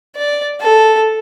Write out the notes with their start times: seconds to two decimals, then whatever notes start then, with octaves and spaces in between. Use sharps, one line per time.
0.16 D5
0.60 A4